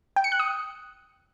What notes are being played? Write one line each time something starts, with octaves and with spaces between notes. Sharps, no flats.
G5
C#7
F#6
D#6